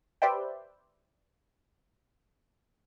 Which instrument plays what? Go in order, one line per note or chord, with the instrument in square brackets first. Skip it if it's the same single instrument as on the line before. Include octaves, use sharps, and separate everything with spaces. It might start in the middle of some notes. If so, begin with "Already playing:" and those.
[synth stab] G4 B4 C5 D5 E5 G5